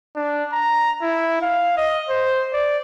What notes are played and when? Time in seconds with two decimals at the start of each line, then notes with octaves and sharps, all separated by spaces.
0.16 D4
0.52 A#5
1.02 E4
1.42 F5
1.77 D#5
2.09 C5
2.53 D5